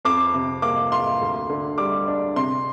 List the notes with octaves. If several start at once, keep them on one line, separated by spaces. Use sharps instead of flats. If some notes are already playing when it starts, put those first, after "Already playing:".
F2 D6
C3
A#3 D6
F4 C6
D2
D3
G3 D6
D4
C3 C6